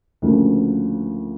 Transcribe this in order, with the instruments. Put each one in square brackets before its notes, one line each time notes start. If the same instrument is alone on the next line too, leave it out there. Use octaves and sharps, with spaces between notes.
[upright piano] D2 C#3 F3 A#3